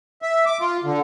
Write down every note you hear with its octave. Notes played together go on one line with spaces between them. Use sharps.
E5
D6
F4
D3